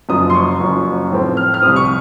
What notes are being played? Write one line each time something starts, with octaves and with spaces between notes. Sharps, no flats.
F#1 F#2 F3 D#6
C6
C#6
F#1 F#2 F3
A2 F3 C4
F6
F6
C2 C3 F3 D#6
C#6